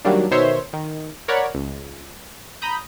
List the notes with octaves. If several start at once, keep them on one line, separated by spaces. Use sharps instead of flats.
D#3 F#3 G3 A#3 D4
B2 D#3 C5 C#5 E5 C6
D#3
A#4 C#5 D5 F#5 B5
C#2
A#5 B5 D#6 G6